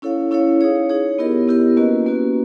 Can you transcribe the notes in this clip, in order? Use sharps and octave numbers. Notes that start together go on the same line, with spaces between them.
C#4 E4 A4 C#5 F5
C#4 E4 A4 C#5 F5
D#4 G#4 C#5
D#4 G#4 C#5
B3 E4 G4 A#4 D#5
B3 E4 G4 A#4 D#5
A#3 C#4 F#4 B4
A#3 C#4 F#4 B4